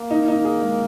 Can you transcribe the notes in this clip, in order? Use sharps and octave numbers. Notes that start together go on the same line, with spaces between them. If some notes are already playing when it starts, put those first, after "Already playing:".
Already playing: A#3
D#4
D#4
G#4
G#3